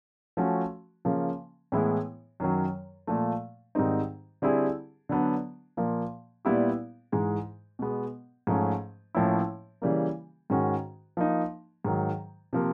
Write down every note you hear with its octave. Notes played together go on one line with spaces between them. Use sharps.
F3 A3 C#4 F#4
C#3 F3 A#3
A2 E3 G#3 B3 E4
F#2 D#3 F#3
A#2 F3 A3
G#2 D#3 G3 C4 D#4
D3 G3 C4 E4 G#4
D3 F#3 B3 D4
A#2 F3 A#3
A#2 G3 B3 E4 G4
G#2 E3 G#3
B2 G#3 B3
G#2 F3 A3 C#4
A2 F3 A#3 C#4 E4
C#3 E3 G3 A#3
G#2 D#3 G#3 C#4 F#4
F3 A#3 D#4
G#2 D#3 F#3
C3 F3 A#3